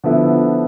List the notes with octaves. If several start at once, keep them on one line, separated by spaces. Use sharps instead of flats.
D3 F3 B3 E4